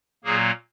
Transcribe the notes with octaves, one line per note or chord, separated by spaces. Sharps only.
A#2 F#3 A#3 G#4